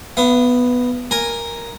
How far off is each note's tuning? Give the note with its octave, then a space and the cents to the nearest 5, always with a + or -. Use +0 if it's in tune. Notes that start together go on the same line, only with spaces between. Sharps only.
B3 +0 F5 -45
A#4 +0 G#5 -10